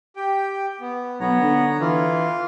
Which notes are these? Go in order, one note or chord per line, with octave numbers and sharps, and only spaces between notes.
G4 G5
B3
B1 B3 C#5 A#5
D3
E3 F4